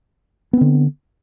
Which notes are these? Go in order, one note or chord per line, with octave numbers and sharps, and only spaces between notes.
D3 B3 C4